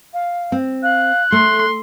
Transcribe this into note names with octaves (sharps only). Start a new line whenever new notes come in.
F5
C4
F5 F#6
A3 A4 C6